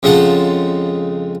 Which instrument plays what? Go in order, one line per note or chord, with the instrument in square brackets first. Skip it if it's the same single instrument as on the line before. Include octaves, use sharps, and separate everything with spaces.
[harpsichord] F2 C#3 G#3 F4 F#5 A5